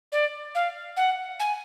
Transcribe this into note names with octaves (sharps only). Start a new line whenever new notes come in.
D5
F5
F#5
G#5